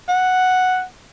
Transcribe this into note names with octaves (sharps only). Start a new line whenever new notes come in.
F#5